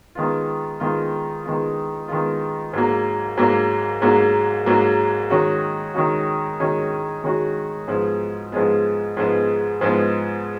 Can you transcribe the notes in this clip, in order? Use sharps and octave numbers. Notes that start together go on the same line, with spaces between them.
D#3 G#3 B3 F4
D#3 G#3 B3 F4
D#3 G#3 B3 F4
D#3 G#3 B3 F4
G#2 F#3 A#3
G#2 F#3 A#3
G#2 F#3 A#3
G#2 F#3 A#3
D#3 G#3 C#4 F#4
D#3 G#3 C#4 F#4
D#3 G#3 C#4 F#4
D#3 G#3 C#4 F#4
G#2 F3 G#3 B3
G#2 F3 G#3 B3
G#2 F3 G#3 B3
G#2 F3 G#3 B3